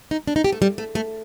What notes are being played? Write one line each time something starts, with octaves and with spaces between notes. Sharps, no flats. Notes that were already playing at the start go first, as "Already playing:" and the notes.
D#4
D4
D#4
G4
A3
G3
A3
A3